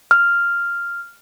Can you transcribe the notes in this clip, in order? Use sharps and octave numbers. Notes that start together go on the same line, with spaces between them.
F6